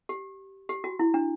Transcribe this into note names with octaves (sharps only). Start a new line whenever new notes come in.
G4
G4
F#4
E4
D4